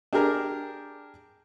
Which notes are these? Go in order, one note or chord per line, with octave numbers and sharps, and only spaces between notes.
D4 G4 G#4 A#4